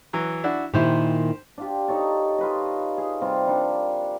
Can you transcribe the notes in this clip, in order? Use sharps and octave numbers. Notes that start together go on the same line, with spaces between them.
E3 F#3
D4 E4 F#4
A#2 D#3 E4 G4 C5
D4 F4 G4
D#4 A4 C#5 A5
F4 B4 D#5
G#4
C3 G3 F4
G3 D4 A#4